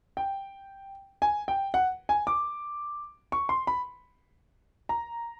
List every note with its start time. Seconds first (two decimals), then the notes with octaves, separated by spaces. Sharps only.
0.17 G5
1.22 G#5
1.48 G5
1.74 F#5
2.09 G#5
2.27 D6
3.32 C#6
3.49 C6
3.67 B5
4.89 A#5